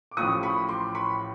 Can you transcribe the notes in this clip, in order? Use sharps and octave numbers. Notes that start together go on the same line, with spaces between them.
D6
A1 A2 F3 C#6 D#6
B5 C#6
C6 D6
B5 C#6